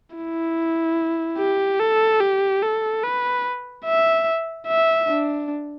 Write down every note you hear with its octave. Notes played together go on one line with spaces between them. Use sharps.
E4
G4
A4
G4
A4
B4
E5
E5
D4